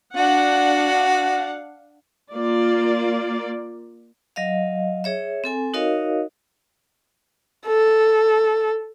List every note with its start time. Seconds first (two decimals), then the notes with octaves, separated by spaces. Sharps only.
0.17 D4 F#4 F5 F#5
2.32 A#3 F4 D5
4.36 F#3 D#5 F5
5.04 G#4 C#5 E5
5.44 C4 A4 G#5
5.74 D#4 F#4 A#4 C#5 D#5 F5
7.67 A4